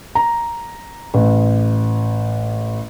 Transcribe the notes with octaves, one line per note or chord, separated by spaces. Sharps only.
A#5
A1